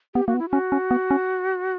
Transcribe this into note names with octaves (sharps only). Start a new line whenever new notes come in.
B3 G4
A#3 F#4
B3
E4
C#4 F#4
C#4
B3
C#4